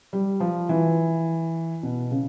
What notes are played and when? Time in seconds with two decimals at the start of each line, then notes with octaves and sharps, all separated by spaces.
0.13 G3
0.40 F3
0.69 E3
1.83 B2
2.11 C#3